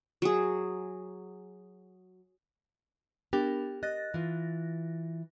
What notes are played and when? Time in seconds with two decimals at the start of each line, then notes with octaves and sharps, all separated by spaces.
0.22 F#3 G#4
3.33 B3 D4 G4 A#4
3.83 D#5 F#6 A6 A#6
4.14 E3 F4